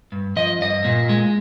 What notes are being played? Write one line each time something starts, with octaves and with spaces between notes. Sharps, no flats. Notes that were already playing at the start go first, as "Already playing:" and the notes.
G2
F3 D#5
G2 D#5
A#2
G#3